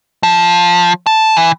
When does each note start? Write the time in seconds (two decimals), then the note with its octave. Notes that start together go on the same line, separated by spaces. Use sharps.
0.23 F3
1.07 A5
1.37 E3